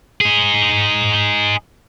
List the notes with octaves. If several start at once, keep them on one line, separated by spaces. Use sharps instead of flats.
D#4 G#4